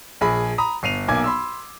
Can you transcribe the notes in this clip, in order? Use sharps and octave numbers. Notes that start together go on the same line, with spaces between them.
A#1 G#4 B5
A#5 B5 D#6
G1 C7 D#7 F7
B1 A#3 G#5 D6 G#6
B5 C6 E6